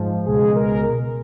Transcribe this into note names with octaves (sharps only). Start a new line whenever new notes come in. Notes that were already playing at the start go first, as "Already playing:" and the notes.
Already playing: G#2 F3
C#2 B2 G#3 G#4
A#4